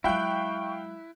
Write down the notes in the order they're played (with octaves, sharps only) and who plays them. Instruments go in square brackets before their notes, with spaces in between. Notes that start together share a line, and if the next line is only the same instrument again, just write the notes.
[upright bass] F#3 G#3 [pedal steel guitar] E4 [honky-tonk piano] F5 G5 F#6 [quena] C#6